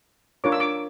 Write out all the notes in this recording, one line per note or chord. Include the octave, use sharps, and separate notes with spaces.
D4 F4 A#4 C#5 D6
E6
D6